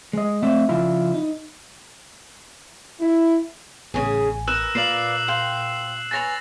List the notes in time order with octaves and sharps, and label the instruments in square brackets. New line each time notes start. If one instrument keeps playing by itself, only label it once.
[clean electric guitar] G#3 D#5
A3 C4 D4 E5
C#3 F3 D4 E4 F4
D#4
[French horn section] E4
[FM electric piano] A1 G#5 [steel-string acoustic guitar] C#3 G#4
[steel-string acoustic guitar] A#4 [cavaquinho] B4 [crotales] E6 F#6 E7
[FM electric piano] A#2 [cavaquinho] B4 D5 F5 [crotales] C7 F#7
[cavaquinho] C5 F5 G5
[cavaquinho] B4 C#5 G#5 [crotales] A6 A#6 F7